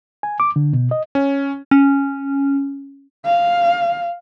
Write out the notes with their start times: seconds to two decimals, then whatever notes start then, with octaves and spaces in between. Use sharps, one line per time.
0.23 G#5
0.40 D6
0.56 D3
0.73 B2
0.91 D#5
1.15 C#4
1.71 C#4
3.25 F5